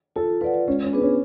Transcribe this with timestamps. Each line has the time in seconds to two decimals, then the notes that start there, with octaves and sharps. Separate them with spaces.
0.16 F4 A4
0.41 F4 B4
0.44 D5 F#5
0.68 G#3 C#4
0.84 C#4
0.93 B3 D4 G#4 B4
1.02 C#4